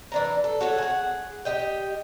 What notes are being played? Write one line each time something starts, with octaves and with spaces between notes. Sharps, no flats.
E3 D4 A#5
A4
F#4 A4 C#5
G#4 F#5
G4 D#5 G5